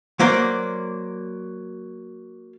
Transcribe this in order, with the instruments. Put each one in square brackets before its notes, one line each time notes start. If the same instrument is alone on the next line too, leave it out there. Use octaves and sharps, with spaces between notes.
[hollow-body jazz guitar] F#3 A#3 C5 D5